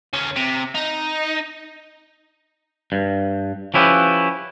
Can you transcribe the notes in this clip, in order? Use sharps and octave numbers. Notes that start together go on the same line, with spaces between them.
D2 C#4
C3
D#4
G2
F3 C#4 E4 G4 B4